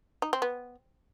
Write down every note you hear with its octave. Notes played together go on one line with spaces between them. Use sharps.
D#4
C4
B3